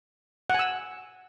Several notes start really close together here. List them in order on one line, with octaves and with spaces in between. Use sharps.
F#5 G#5 E6